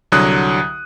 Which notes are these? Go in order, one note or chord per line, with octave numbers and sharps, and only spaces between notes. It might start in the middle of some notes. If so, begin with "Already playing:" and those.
C2 D3 F#3 D#6 F#6